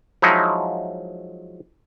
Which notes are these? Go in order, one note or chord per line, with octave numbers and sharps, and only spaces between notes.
F3 F#3 G#3 D#4 E4